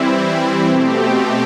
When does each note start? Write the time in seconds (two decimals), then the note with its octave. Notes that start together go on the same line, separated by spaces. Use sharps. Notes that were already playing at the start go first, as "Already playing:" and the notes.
Already playing: E3 G3 C4 E4
0.68 B2 A3 C4 G4